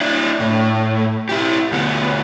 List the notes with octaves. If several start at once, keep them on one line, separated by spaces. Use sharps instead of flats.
D4 E4
A2
E4 G4
D2 B3